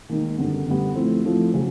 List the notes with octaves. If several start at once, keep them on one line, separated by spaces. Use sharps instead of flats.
D#2 D#3 G#3
F#2 D3 G3 B3
F#2 D3 G3 B3
A2 F3 A3 C4
A2 F3 A3 C4
C#3 F#3